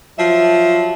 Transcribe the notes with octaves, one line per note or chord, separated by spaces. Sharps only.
F3 F#3 E5